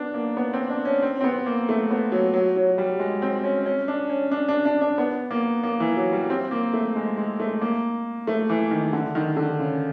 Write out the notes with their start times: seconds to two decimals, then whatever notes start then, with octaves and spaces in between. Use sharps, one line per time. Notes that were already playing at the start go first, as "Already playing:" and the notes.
Already playing: B3 D4
0.14 A#3
0.37 B3
0.53 C4
0.70 D4
0.85 C#4
1.02 C4
1.21 C4
1.24 B3
1.46 A#3
1.69 A3
1.91 B3
2.12 F#3
2.34 F#3
2.56 F#3
2.78 G3
2.99 G#3
3.22 C4
3.44 C#4
3.66 C#4
3.88 D4
4.10 C#4
4.31 D4
4.48 D4
4.65 D4
4.81 D4
4.98 B3
5.31 A#3
5.63 A#3
5.80 E3
5.96 F#3
6.13 G3
6.30 C4
6.51 A#3
6.73 A3
6.96 G#3
7.17 G#3
7.40 A3
7.61 A#3
8.27 A3
8.49 E3
8.71 D#3
8.93 D3
9.15 D#3
9.36 D3
9.59 C#3